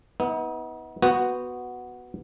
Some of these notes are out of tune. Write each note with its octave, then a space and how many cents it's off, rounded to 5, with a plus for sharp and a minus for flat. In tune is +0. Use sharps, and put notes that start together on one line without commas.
B3 +0 D#4 +45
B3 +0 F#4 +0 C5 +0